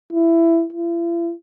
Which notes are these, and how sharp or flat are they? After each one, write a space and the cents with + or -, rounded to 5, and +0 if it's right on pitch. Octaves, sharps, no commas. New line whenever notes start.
E4 +15
E4 +45